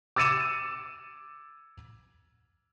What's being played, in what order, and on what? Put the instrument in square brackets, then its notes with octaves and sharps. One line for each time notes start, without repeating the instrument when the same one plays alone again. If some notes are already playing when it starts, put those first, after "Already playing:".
[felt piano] D6 E6 A6 C#7 D#7 E7